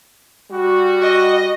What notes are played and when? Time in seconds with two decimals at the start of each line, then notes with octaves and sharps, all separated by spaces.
0.51 G3 F#4
1.03 D#5